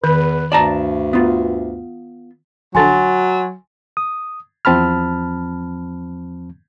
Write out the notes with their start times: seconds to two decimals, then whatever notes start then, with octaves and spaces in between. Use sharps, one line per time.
0.04 E2 D#3 B4
0.52 D2 G2 D5 A5 A#5
1.13 B3 F4
2.75 A#1 D3 F#3 D4 G#5 C6 A6
3.97 D#6
4.65 E2 F3 C4 A5 B5 F6